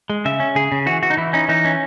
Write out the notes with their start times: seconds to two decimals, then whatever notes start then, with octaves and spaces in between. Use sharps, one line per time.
0.10 G#3
0.25 C#3 E5
0.40 C#4
0.55 C#3 G#4
0.72 C#3
0.86 E3 F#4
1.02 E3 F#4
1.10 D#4
1.17 E3 E4
1.33 C#4 D#4
1.49 E3 D#4
1.65 C#4